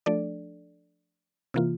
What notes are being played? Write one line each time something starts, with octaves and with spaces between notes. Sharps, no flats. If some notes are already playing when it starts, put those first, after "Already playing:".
F3 A3 D4 A4 D5
C3 E3 A#3 F4